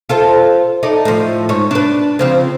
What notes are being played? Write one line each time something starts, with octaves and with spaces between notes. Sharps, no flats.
F4 A4 C5
D#4 A4 D5
A2 F3
G#2 C#5
D4 B4
C#3 F3 C4